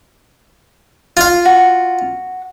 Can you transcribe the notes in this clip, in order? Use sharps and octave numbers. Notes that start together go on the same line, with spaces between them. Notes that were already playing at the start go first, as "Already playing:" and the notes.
F4 F5
F#4